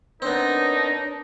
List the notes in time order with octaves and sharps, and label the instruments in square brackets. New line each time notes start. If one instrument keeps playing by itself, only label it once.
[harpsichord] B3 C4 [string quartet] D4 [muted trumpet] D#4 [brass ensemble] A#4 C#5